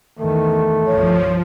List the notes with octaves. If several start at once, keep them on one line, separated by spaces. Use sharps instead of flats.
E2 D#3 A3
G1 C2 F3 C#5